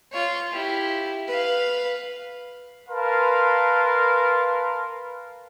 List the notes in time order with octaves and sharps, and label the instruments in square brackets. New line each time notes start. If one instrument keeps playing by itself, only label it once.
[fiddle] F4 C#5
E4 G4
B4 F5
[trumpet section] A#4 B4 F5 A5 C6